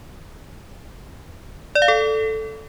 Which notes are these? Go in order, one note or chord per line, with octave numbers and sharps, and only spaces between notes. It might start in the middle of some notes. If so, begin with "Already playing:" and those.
D5
F5
A4